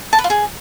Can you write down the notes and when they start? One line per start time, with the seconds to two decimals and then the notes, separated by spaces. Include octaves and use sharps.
0.13 A5
0.18 B4
0.24 F4
0.30 G#4